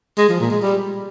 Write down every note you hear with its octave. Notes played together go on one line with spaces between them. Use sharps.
G#3
F3
A#2
G#3
G3